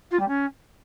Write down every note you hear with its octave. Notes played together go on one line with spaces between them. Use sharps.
F4
G3
C#4